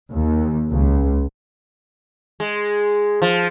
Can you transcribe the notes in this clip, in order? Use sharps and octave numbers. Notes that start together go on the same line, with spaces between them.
D#2
C#2
G#3
F3